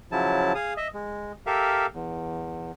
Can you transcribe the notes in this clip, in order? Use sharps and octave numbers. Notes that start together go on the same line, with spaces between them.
C#3 F3 F#3 E4 A5
G#4 F5 D#6
D#5 E5
G#3
G4 A4 A#4 E5 F5
E2